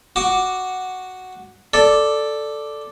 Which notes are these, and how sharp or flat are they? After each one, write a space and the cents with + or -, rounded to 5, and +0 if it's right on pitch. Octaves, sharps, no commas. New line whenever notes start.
F#4 +0 D6 +0
A4 +0 D5 +0